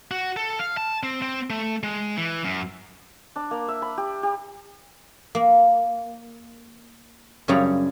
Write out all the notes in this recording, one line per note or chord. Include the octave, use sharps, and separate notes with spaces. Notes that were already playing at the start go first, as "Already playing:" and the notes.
F#4
A4
F5
A5
C4
C4
A3
G#3
E3
F#2
D4
A#3
E5
B5
G4
G4
A#3
F#2 C#3 G3 C#5 A#5